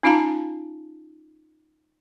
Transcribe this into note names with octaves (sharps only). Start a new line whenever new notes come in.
C#4 D#4 F4 F5 A5 A#5